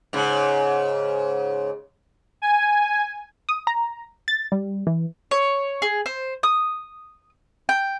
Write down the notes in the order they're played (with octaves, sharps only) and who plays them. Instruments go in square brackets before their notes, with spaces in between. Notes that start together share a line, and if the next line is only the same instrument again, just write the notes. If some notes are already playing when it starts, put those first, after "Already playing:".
[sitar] G#2 C#3
[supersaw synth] G#5
[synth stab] D#6
A#5
A6
G3
E3
[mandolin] C#5
G#4
C5
D#6
G5